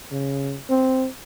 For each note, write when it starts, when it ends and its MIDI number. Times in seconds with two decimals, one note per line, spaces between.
0.11 0.57 49
0.70 1.06 60